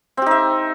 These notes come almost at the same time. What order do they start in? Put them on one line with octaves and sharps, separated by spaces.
C4 G4 D#4 E5